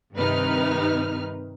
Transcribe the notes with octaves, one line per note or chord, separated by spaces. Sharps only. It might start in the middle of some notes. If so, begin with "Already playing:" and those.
G2 C3 D#3 D#4 B4 F6